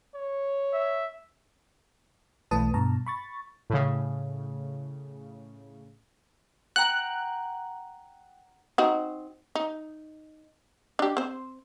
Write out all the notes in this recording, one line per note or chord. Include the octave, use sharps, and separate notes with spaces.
C#5
E5
B1 E3 A3 B4 A5 D#6
G2 B2 A5 A#5
B5 C#6 A6
A2 C#3
F#5 G5 A#5 F#6
C4 D#4 F#4
D#4
D4 G4
C4 C5